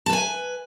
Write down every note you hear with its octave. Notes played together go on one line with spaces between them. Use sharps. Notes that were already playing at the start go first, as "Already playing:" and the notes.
B4 G#5 A5